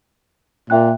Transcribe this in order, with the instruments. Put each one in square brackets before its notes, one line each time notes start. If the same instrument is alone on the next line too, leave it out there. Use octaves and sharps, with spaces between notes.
[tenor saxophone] A#2 [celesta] E5 G5 F#6